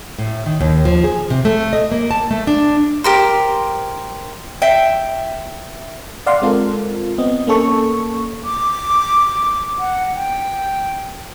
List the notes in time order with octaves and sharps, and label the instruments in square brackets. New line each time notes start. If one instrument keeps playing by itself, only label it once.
[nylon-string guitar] A2
D#3
D#2
F3
G#4
C3
A3
D#5
A#3
A5
A3
D4
[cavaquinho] G4 A#4 C5
[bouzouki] E5 G5
[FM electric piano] D5 F5 F#5 C6
G#3 C4 F4 A4 A#4
B3 C4 D#5
A#3 C#4 A4 C#6
[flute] D6
F#5
G5